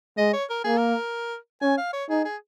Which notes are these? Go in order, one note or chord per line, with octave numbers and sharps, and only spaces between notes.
G#3 D#5
C#5
A#4
A#3 G#4
A#4
C#4 G#5
F5
C#5
D#4 G#4
G#4